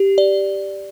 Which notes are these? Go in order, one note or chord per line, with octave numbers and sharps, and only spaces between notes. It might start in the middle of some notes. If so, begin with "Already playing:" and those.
Already playing: G4
D5